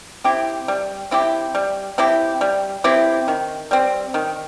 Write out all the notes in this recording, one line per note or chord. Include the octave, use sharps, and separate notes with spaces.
C4 E4 G4
G3
C4 E4 G4
G3
C4 E4 G4
G3
C4 E4 G4
D#3
G3 C4
D#3